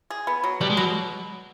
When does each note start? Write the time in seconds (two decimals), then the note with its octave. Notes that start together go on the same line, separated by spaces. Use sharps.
0.10 G#4
0.27 B3
0.44 F#3
0.61 B2 G3
0.70 G#3
0.77 B2 F#3